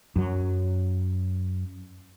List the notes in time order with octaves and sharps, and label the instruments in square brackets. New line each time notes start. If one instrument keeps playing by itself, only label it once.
[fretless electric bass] F#2 F#3